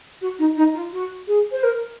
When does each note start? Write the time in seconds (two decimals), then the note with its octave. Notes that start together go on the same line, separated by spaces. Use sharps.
0.21 F#4
0.38 D#4
0.56 D#4
0.74 F4
0.92 F#4
1.27 G#4
1.51 C5
1.63 A#4